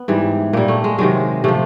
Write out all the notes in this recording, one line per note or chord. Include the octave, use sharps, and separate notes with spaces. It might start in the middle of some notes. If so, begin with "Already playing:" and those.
Already playing: B3
G#2 E3 G3
A#2 G3 A#3
A3
G#3
C3 D#3 F#3 G#3
C3 F3 A3